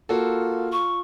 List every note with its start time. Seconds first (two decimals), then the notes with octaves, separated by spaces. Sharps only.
0.09 A#3 F4 F#4 A4
0.72 C#6